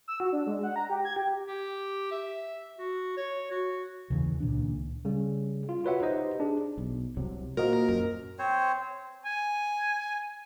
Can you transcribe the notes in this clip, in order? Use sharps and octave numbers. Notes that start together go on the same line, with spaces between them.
E6
F#4
D4
G#3
F#5
A#5
G4
G#6
G4
G4
E5
F#4
C#5
F#4
D#2 C#3 E3
C#2 A#2 D#3 D4
C#3 G3
F4
F4 F#4 B4 C#5 E5 F#5
D#4 G4 C5 D#5
D4 G#4
B1
C2 C3 F#3
A#2 A#3 F#4 A#4 C5 D#5
F#2
C4 C5 C#5
G#5